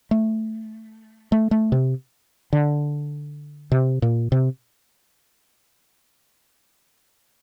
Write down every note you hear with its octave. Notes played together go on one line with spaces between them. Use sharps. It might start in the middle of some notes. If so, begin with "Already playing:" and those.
A3
A3
A3
C3
D3
C3
A#2
C3